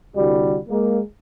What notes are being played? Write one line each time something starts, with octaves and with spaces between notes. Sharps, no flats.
C2 D3 G3 F#4
G#3 A#3